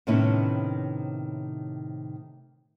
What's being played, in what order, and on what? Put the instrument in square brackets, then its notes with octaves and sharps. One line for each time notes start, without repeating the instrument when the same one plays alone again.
[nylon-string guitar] A2 C3 D#3 B3 C#4 E4